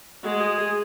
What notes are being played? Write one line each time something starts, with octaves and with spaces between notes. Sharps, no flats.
G#3 F#4
G#4
G#4